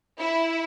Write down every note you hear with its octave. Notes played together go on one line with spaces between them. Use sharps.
E4